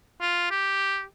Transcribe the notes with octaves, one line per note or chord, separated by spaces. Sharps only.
F4
G4